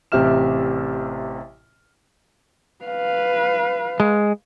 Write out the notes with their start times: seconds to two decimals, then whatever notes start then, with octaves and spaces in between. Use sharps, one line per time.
0.12 A1 C3 G4 E5 F6 E7
2.85 B4 F5
4.00 G#3